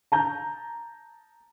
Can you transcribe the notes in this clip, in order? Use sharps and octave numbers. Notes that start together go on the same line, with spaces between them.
A5 A#5 G6